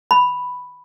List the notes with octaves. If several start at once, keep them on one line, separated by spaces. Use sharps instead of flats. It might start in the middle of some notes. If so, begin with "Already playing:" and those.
B5